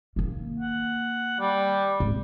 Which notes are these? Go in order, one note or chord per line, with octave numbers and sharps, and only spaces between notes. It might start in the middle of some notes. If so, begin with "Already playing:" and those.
D#3 A#3
F#5
G3
G#1